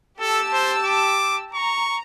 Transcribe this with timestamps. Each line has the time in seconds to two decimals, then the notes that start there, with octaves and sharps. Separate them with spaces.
0.20 G4 A4 A5 E6
0.53 C5
0.85 D6
1.54 A#5 C#6